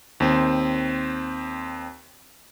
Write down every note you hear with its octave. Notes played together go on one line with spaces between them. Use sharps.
D#2 C4